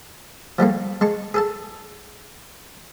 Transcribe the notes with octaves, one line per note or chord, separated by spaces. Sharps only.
F3 G3 A3 A#3
G#3 A5 C#6
G#4 A4 A5